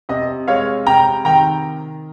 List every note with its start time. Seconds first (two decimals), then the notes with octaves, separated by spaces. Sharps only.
0.09 C3 D#5
0.48 G#3 C#5 F5
0.86 C3 G5 A#5
1.25 D#3 G5 A#5